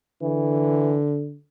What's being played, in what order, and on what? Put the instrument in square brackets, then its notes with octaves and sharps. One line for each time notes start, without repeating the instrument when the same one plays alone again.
[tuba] D3 [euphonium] E3